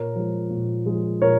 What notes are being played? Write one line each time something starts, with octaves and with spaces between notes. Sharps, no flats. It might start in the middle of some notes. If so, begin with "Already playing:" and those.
Already playing: A#2 A#4 C#5
F3 G#3
A#2
F3 G#3
A#2 A#4 C#5